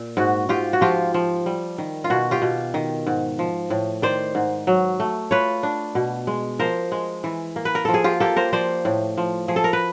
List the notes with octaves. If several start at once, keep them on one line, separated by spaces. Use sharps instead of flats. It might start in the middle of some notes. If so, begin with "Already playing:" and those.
Already playing: A#2
G#2 F#4
G#2 F4 G4
F#4
F3 F4 G4
F3
G3
D#3
F4
B2 F#4
F4 G4
B2
D#3
G#2
F3
A2
D#3 C5 D5
G#2
F#3
A3
F4 B4 C#5
D4
B2
G#3
F3 A#4 C5
G#3
E3
A#3
B4
A#4
F3 A4
G#4
F4 G4
A#3 G4 A4
A#4 C5
F3 C5 D5
A2
F3
F3 G#4
A4
A#4
B4